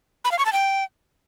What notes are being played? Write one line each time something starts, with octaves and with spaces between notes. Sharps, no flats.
B5
F5
C#6
A5
G5